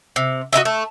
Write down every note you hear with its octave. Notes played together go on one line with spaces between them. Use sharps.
C3
F#4 A#4 D#5 E5
A3